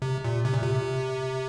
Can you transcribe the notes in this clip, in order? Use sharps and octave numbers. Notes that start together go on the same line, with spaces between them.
C3
A#2
C3
A#2
C3